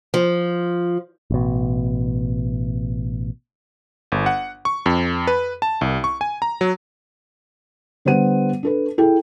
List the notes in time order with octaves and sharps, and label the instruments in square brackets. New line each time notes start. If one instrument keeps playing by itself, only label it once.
[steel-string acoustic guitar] F3
[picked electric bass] A1 B2
[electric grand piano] G1
F#5
C#6
F2
B4
A5
C2
C#6
G#5
A#5
F#3
[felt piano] D3 G3 B3 C5 F#5 D#7
D4 A4 B4
E4 G#4 A4 G5